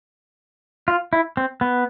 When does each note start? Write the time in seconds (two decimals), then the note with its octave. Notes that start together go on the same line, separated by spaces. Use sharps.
0.88 F4
1.13 E4
1.37 C4
1.61 B3